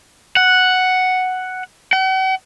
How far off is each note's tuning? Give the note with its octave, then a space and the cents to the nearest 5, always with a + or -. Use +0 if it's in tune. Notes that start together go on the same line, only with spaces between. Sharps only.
F#5 +0
F#5 +45